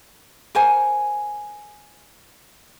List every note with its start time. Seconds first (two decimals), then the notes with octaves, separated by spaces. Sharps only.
0.55 A#4 C5 G#5